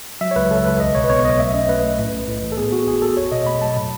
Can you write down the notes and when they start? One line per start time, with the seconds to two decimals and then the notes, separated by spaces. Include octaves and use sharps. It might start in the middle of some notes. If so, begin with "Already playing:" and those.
0.21 F#3 E5
0.31 C#5
0.36 C#2 B4
0.50 C#2 A4
0.65 C#2 B4
0.80 B1 D#5
0.95 B2 C#5
1.04 B4
1.10 B3 C#5
1.25 B1 D#5
1.39 A3 E5
1.54 C#4 D#5
1.69 A3 B4
1.84 A3
1.99 A2
2.13 B1
2.28 A2
2.43 E3
2.52 A4
2.57 B3 G#4
2.72 B3 F#4
2.87 G#1 G#4
3.02 G#1 A4
3.17 E2 C#5
3.32 B2 D#5
3.47 A3 B5
3.61 F#3 A5
3.76 A2